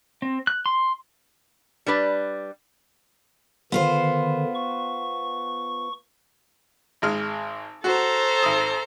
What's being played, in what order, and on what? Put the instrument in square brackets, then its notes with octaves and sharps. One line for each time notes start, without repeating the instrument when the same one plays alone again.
[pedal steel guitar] C4
F#6
C6
[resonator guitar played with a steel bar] G3 D4 B4 D5
[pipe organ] D3 D#3 [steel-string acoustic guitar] B3 F4 C5
[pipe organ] C#6
[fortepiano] G#1 G#3 F6
[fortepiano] F#4 [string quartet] A4 C5 A#5
[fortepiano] G#1 D#6